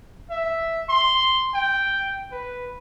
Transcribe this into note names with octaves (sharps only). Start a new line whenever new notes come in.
E5
C6
G5
B4